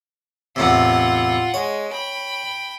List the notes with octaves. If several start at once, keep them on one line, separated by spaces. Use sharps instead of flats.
E2 A2 C3 F4 F#5
G#3 C#5
G5 B5